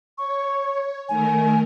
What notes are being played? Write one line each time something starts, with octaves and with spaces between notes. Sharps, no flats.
C#5 C#6
D#3 A3 A#4 G#5